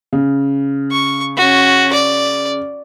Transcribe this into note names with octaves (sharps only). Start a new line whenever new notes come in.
C#3
C#6
C#4 F#4
D5